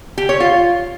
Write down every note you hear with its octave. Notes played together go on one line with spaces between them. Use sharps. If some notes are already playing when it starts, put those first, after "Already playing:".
G4
C#5
F4